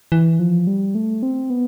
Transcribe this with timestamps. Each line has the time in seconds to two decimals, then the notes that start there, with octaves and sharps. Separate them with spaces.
0.12 E3
0.39 F3
0.67 G3
0.95 A3
1.23 C4
1.50 B3